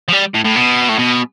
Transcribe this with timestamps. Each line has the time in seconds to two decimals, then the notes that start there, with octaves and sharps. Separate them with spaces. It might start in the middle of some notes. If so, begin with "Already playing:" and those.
0.08 F3
0.12 G3
0.34 A2
0.44 A2
0.56 B2
0.89 A2
0.99 B2